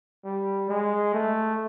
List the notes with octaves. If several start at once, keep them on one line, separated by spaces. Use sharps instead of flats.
G3
G#3
A3